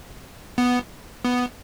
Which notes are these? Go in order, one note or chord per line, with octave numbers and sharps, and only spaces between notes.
B3
B3